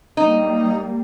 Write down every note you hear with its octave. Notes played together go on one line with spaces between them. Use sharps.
G3 A#3 D#4